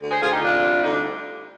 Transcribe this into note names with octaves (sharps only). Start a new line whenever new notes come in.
D2
G#4 C5
D2 F4 G#4
D#4 G4
C3 D4 F4
G3
D2 D#4
D4